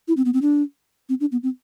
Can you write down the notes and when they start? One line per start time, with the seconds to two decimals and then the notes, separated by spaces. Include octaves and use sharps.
0.08 E4
0.17 C4
0.25 B3
0.34 C4
0.42 D4
1.09 C4
1.20 D4
1.32 B3
1.43 C4